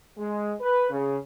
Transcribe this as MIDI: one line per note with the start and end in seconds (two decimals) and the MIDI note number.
0.18 0.52 56
0.60 0.87 71
0.90 1.16 49